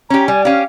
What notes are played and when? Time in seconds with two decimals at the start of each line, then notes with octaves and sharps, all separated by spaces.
0.10 C#4 G4 A#5
0.27 G3 G#5
0.45 C#4 G4 F5